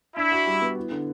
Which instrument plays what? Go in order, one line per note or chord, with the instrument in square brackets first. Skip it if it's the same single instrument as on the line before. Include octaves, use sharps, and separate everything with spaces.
[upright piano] D4 [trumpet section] E4
[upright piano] F#4
G3
B3
E4
D3